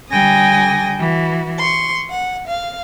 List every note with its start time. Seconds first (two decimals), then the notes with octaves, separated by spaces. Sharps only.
0.12 D3 G3 G5 G#5 D#6 A#6
0.98 E3 F#4
1.58 C6 C#6
2.10 F#5
2.47 F5